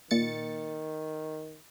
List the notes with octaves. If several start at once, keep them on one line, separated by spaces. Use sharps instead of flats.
A#2 D#3 A6 C#7